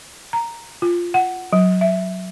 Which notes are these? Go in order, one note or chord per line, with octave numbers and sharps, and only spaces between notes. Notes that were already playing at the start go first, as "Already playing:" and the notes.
A#5
F4
F#5
F#3
E5